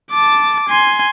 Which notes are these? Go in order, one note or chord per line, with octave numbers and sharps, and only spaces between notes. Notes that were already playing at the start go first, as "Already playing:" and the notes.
A5 D6
G#5 C6